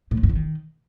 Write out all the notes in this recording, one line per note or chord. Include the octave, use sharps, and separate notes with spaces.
A2
C#3
G2
C#3
D#3